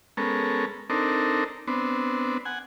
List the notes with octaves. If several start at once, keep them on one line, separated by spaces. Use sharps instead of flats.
G#3 B3 C#4 A4 A#4
C4 D4 D#4 A4 A#4
B3 C4 D4
F#5 G#5